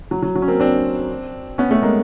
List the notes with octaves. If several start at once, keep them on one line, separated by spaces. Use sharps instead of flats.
F#3
F#3
F#3
C#4
A#3 C4
C4 D4
B3 C#4
A3 B3
G#3 A#3